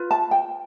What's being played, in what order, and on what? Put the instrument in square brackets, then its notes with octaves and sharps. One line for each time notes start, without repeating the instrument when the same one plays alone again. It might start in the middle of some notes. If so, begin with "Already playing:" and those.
Already playing: [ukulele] F4 B4
A5
G5